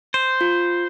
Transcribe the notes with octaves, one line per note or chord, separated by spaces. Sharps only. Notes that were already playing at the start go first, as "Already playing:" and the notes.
C5
F4